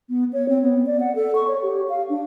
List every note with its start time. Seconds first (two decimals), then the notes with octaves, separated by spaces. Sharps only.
0.09 B3
0.33 C#5
0.49 C4
0.62 B3
0.86 D5
1.00 F#5
1.15 A4
1.35 C#6
1.47 C#5
1.62 G4
1.89 F5
2.09 D4